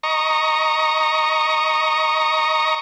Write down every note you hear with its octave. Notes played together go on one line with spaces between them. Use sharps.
D#5 A#5 C#6